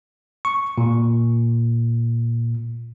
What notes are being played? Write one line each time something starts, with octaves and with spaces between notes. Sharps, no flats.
C#6
A#2